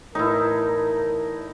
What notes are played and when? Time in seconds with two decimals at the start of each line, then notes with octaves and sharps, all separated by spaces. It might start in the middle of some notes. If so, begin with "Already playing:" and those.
0.15 E2 A2 D#4 E4 A#4